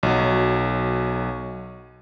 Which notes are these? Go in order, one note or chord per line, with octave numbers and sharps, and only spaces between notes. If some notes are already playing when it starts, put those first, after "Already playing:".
B1 F#3